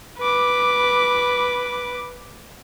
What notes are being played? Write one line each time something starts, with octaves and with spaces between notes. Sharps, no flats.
B4 D6